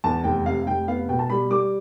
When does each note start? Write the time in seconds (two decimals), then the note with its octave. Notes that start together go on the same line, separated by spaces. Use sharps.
0.04 E2 A5
0.24 F1 G5
0.45 C3 F5
0.67 F1 G5
0.88 B3 F5
1.08 B2 G5
1.19 A5
1.30 G3 B5
1.50 G3 D6